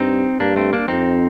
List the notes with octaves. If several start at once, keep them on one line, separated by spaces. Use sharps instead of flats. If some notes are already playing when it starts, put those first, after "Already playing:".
Already playing: G2 C4 D#4
G2 A#3 D4
A3 C4
A#3 D4
F2 C4 D#4